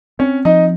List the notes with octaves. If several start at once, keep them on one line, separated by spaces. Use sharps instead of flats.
C4 C#4 C#5
F3 D#4 D#5